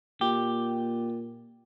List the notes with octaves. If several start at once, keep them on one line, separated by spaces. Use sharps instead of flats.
A#2 G4